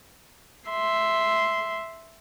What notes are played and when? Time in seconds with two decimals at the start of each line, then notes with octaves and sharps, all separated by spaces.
0.69 E5 C6